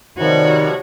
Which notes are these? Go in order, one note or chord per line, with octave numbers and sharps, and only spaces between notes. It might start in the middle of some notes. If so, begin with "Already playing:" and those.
C3 D#3 F3 G3 F#4 C#5